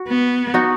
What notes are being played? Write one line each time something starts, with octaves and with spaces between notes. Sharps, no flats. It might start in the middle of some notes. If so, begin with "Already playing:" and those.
Already playing: F#4
B3
D#4 F#4